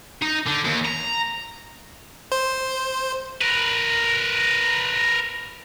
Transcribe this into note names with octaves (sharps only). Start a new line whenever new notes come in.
D#4
D3
D#2
A#5
C5
A#4 B4